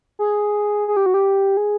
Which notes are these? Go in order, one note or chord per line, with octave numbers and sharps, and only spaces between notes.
G#4
G#4
G4
F#4
G4
G#4